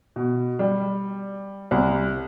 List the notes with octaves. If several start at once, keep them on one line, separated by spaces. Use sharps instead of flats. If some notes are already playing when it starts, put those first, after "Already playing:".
B2
G3
C2